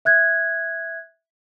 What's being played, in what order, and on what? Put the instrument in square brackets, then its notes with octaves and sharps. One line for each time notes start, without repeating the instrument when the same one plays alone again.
[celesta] E5 F#6 G#6